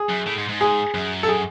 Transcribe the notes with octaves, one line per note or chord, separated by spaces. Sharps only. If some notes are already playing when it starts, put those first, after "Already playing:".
Already playing: G#4
F#2
A2
G#2
G#2
G#4
F#2
A4
G#4